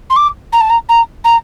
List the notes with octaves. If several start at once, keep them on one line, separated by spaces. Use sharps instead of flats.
C6
D6
A#5
A5
A#5
A#5
A#5